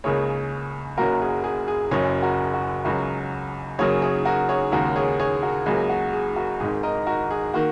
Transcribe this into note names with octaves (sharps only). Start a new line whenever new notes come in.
C#2 C#3 A#3 G#4 C#5
F#1 F#2 F#3 A#3 F#4 A#4
G#4
G#4
G#4
F#1 F#2 C#3 F#3 G#4 C#5
F#4 A#4
F#4
C#2 C#3 F#3 F#4 A#4
F#2 C#3 F#3 A#3 G#4 C#5
G#4 C#5
F#4 A#4
G#4 C#5
D#2 C#3 G#3 F#4 A#4
G#4 C#5
G#4 C#5
F#4 A#4
C#2 C#3 F#3 A#3 G#4
F#4
G#4
F#4 A#4
G#1 G#2 D#3 G#4
A#4 D#5
F#4 A#4
G#4
D#3 A#3 F#4